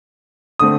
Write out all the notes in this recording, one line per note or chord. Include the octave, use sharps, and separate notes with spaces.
D3 A3 C4 D#6